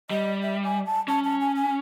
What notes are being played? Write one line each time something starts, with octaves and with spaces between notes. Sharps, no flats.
G3 D#5
E5
G#5
A5
C#4 A5
A5
G#5
G#5